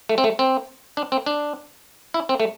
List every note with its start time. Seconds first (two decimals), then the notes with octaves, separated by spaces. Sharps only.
0.09 A3
0.18 C4
0.24 A3
0.39 C4
0.97 D4
1.12 C4
1.26 D4
2.14 E4
2.29 C4
2.40 A3